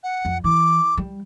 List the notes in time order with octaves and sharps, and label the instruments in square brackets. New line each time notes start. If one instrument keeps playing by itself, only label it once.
[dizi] F#5
[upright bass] F2
[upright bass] E3 [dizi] D6
[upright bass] G3